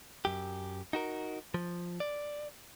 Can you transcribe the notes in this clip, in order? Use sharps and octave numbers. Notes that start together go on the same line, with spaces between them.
F#2 G4
D#4 F#4 A#4
F3
D5